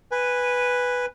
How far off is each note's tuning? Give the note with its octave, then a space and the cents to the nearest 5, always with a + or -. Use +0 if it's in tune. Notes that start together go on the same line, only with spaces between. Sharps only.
B4 +0 G#5 -15